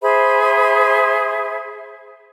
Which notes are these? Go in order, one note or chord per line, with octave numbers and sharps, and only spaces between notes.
G#4 C5 E5 B5